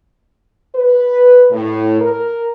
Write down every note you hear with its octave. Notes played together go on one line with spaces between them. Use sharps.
B4
A2
A#4